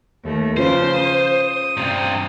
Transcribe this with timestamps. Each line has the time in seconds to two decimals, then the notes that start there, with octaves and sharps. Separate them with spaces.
0.24 D#2 A3
0.57 C#3 F3 C#4 F4 B4 C5
0.93 D#6
1.77 G2 C3